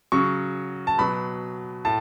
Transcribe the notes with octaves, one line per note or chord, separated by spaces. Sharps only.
C#3 F#3 C#6
A5
B2 F#3 B5
A2 A5